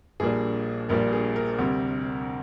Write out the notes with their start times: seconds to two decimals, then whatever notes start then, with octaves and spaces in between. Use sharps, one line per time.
0.20 A#1 A#2 G3 A#3 D4 G#4
0.89 A#1 A#2 G3 A#3 D4 A#4
1.13 G#4
1.36 A#4
1.58 D2 C3 G3 C4